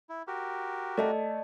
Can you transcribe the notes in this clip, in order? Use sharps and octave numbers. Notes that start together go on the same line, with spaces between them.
E4
F#4 G4 A#4
A3 D5 D#5 A5